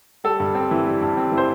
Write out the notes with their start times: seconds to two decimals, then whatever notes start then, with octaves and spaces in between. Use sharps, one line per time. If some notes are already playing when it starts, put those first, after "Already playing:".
0.24 G3 A4
0.40 G2
0.55 C4
0.71 E3
0.86 G3
1.02 G2
1.17 C4
1.32 E3
1.38 C5